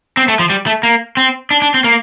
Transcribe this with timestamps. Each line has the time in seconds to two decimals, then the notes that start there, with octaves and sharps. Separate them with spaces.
0.17 C4
0.28 A3
0.39 F3
0.50 G3
0.66 A3
0.83 A#3
1.17 C4
1.51 D4
1.62 D4
1.74 C4
1.84 A#3